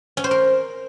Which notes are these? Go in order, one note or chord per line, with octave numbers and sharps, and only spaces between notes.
C#4
C5
A#4